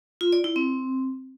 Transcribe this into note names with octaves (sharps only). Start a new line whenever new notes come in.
F4
D5
E4
C4